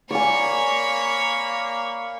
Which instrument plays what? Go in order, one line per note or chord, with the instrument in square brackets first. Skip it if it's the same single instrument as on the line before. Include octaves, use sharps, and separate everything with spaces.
[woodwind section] A#3 [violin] C#5 B5 [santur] D5 G#5